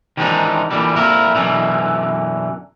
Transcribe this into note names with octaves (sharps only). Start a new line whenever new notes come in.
D#3 E3 G#3 C4 D4 D#4
A#2 D3 E3 G3
F2 A#2 E4 A#4
F#2 B2 D3 E3